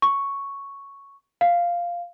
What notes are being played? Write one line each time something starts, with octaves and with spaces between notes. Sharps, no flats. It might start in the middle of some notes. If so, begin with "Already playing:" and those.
C#6
F5